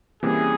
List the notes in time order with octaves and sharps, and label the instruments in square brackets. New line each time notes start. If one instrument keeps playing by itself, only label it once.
[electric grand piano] C3 E3 G3 A#3 C#4 [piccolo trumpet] G#4